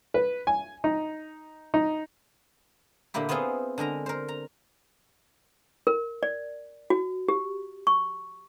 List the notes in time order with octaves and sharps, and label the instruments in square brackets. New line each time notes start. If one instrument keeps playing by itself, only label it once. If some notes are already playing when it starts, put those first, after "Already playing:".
[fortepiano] B4
G#5
D#4
D#4
[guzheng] A#2 D3 A#3 E4 G4
B3 C4 E4 F4 G#4 C5
D3 G#3 A#4 A#5
A#4 C5
A#5
[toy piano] A#4
D5
F#4
G4
C#6